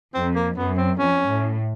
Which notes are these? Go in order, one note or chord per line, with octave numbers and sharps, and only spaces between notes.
F2 C4
A#3
F#2 B3
C4
F2 C#4
A2